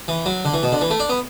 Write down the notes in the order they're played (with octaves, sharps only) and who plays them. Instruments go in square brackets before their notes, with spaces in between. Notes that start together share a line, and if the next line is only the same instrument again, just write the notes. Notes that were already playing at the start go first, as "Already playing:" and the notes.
[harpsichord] E3
F#3
D3
E3
B2
D3
E3
A3
D4
B3